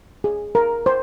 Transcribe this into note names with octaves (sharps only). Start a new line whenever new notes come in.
G#4
A#4
C5